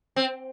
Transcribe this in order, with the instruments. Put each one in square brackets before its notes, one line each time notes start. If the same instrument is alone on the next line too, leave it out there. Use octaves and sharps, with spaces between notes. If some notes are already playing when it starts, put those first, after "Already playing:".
[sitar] C4